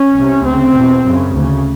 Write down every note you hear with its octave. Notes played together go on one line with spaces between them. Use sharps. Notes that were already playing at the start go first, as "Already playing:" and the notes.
Already playing: C#4
C2
C3
D2 C#3 C4
E2 B2
F#2 C#3
D2 C#3